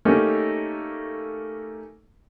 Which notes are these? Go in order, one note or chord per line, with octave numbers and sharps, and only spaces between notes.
A3 A#3 C#4 D#4 G4 A#4